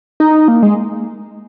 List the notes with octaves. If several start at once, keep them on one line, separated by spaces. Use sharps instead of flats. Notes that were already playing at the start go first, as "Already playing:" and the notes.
D#4
A#3
G#3